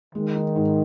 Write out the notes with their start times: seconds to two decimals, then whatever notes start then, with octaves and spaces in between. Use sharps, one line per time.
0.14 D#3 G#3
0.36 D#4
0.56 G#2